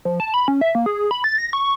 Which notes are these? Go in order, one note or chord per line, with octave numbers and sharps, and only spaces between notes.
F3
A5
B5
C#4
E5
A#3
G#4
B5
A6
A#6
C#6